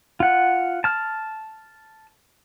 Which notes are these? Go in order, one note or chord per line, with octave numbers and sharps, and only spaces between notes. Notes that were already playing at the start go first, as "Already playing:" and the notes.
F4 F#5
A5 F6